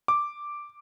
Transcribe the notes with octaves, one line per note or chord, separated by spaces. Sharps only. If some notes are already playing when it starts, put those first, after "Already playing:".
D6